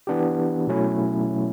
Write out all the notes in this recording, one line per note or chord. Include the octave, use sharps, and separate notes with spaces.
E3 B3 D4 G4
B2 F#3 A3 C#4 E4